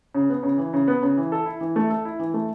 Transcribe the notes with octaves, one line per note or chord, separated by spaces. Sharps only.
C#3
B3
C#3
E3
C#3
B3
C#3
E3
A4
E4
E3
A3
A4
E4
E3
A3